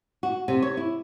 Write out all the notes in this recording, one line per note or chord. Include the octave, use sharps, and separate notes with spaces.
F#4
C3
C#5
E4